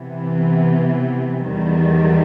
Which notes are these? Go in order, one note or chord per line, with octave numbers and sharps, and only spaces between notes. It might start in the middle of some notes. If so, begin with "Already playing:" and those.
Already playing: C3 E3 B3
E2 D#3 G3